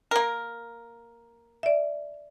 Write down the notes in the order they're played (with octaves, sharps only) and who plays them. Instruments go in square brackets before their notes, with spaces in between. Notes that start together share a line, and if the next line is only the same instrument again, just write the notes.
[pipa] A#3 A#4
[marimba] D5 E5